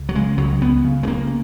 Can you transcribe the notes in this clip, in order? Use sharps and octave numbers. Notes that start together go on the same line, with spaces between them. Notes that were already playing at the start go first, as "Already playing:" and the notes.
Already playing: C#2
F#3
C#3 G#3
C#2 F#3
C#2 B3
C#3
G#3
C#3 A#3